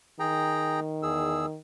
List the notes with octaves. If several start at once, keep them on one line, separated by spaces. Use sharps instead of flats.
D#3 G#4 G5 A#5
E2 G#4 E6